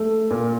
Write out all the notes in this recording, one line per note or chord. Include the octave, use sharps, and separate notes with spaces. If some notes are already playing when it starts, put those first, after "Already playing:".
Already playing: A3
A#2